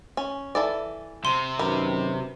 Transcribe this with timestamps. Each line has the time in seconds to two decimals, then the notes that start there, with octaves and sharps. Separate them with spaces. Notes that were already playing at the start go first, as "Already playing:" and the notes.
0.17 C#4
0.55 E3 A4 D5
1.25 C3 C6
1.59 F#2 D#3 A#4 B4